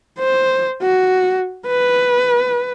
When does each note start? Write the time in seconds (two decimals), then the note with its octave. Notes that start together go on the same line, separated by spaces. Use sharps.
0.19 C5
0.82 F#4
1.67 B4